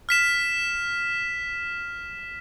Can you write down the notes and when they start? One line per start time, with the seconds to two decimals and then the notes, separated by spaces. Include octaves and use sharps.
0.09 F6 B6 E7